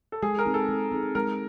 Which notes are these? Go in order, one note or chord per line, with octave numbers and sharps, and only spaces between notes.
A4
G#3 G#4
A#4
C4 D#4 G#4
A4
G#3
C4 D#4 G#4
G#3 A#4